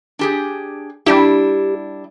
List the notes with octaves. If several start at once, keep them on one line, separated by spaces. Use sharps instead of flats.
D4 G4 G#4
G3 D4 E4 G4